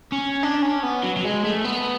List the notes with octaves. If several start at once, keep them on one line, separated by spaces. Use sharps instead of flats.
C#4
D4
C#4
B3
F#3
F#3
G#3
A3
B3